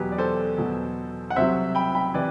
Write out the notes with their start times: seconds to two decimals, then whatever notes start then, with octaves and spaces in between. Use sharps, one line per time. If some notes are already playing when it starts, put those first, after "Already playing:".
Already playing: E2 B2 F#3 G4 B4
0.12 D5
0.18 A4 C5
0.58 E2 B2 F#3
1.30 F#5
1.36 C2 C3 F#3 C5 E5
1.75 G5 B5
1.95 G5 B5
2.14 C3 E3 B4 D5